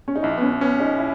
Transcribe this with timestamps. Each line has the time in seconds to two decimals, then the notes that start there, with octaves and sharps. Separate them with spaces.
0.08 C#4
0.16 D#4
0.23 A#1 E4
0.38 B3
0.42 C#4
0.61 B3 C#4
0.80 D#4
0.98 E4